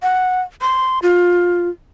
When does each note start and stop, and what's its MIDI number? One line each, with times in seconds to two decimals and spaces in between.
0.03 0.41 78
0.61 0.99 84
1.03 1.69 65